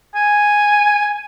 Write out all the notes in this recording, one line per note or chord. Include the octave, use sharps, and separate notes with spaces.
G#5